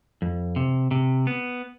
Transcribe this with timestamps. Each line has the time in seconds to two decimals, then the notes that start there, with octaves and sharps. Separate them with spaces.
0.22 F2
0.56 C3
0.91 C3
1.27 B3